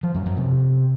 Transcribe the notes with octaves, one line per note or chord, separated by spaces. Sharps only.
F3
F#2
F#2
C3